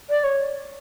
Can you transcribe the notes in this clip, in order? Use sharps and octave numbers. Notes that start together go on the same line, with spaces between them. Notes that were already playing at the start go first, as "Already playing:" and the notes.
D5
C#5